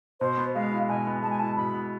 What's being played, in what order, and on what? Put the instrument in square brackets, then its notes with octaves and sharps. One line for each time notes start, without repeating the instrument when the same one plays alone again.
[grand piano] B2 [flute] C5
[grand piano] B3
[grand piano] G#3 [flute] F5
[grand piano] E4
[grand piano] B2 [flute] G#5
[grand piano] B3
[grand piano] G#3 [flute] A5
[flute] G#5
[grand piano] E4 [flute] A5
[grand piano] B2 [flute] B5
[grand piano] B3